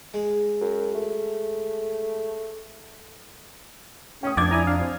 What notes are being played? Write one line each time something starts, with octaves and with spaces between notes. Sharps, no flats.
G#3
F#2
A3
C#4 G5 D#6
F2 D4 D5 D#6 G6 G#6
E4 D5 G#5 A#5
D4 F5
C4